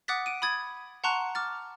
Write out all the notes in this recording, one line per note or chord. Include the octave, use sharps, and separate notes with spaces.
F#5 D6 D#6 F#6 A6 B6
D7 D#7
B5 D#6 G#6 A6
F#5 A5 A#5 C6 C#6 F#6
D6 F6 A6